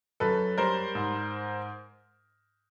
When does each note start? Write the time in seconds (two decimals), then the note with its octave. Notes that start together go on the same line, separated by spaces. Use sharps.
0.20 F#2 A4 B4
0.58 G3 A#4 C5
0.95 G#2